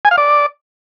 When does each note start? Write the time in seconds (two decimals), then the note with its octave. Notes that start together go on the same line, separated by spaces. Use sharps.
0.05 G#5
0.11 F5
0.18 D5